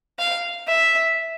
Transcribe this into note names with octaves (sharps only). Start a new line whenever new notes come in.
F5
E5